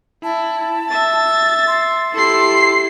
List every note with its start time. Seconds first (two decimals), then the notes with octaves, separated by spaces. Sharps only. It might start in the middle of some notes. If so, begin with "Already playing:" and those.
0.24 E4 A5
0.90 E5 A6
1.67 C6
2.14 E4 G4 A4 C7